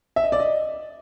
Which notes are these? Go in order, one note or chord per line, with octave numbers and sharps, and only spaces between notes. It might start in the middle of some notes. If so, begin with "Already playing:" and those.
E5
D#5
D5
D#5